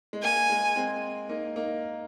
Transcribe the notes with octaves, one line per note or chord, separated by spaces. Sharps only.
G#3
A#3 G#5
G#3
G#3 C4
A#3 D#4
A#3 D#4